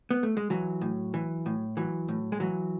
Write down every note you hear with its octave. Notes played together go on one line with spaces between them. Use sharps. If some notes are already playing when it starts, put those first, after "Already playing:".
B3
A3
G#3
E3 F#3
A2
E3
A2
E3 F#3
A2
G#3
E3 F#3